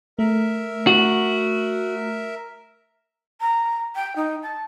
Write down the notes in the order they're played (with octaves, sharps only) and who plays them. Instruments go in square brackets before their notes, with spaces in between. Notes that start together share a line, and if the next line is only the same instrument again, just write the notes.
[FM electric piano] A3 [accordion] A#4 E5
[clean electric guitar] F#4
[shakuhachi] A#5
G5
D#4
A5